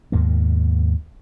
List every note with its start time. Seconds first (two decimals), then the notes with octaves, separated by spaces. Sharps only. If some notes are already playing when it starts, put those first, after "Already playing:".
0.12 D#2 G#2 B2 A#3